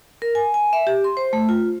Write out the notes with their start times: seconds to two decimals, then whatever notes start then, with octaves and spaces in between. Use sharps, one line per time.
0.22 A#4
0.35 G#5
0.54 G#5
0.73 E5
0.87 G4
1.04 C6
1.17 C5
1.33 A3
1.49 F4